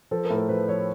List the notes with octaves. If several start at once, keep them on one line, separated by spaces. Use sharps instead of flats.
F3 A4
A#4
A2
A#4
F3 B4
F3 C#5